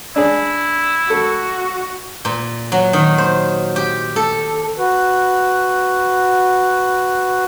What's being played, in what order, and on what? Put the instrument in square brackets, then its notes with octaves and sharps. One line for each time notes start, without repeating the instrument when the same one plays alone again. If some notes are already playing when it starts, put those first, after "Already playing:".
[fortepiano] D4 G#4 [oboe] E4
[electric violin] F#4 [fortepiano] A4
[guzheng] A#2
F#3
D#3
C5
G4
A4
[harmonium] F#4 B4